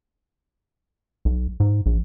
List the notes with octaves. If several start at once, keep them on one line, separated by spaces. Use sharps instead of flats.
B1
G#2
A#1